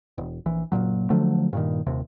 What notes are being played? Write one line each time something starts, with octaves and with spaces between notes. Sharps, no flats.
E1
A#1 E3
F#1 D#2 A#2 F#3
D3 F3 F#3 A3
G2 A#2 D#3
D#1 D#2 C3